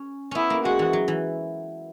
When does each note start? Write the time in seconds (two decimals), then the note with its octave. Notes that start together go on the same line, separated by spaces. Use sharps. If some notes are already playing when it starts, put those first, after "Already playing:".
Already playing: C#4
0.31 B3 C#4 E4
0.50 A#3
0.65 G#3 F#4
0.79 E3
0.93 F#3
1.08 E3